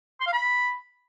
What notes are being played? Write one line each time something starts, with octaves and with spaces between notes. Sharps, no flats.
C6
F5
B5